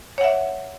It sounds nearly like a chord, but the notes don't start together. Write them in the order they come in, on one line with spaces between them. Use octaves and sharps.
C#5 F#5 E5